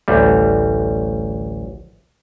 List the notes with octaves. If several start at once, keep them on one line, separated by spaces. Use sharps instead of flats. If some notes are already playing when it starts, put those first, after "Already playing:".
A1 D2 G3